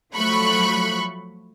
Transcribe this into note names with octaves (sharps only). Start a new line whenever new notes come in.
F3 F#3 A3 B5 C#6 F#6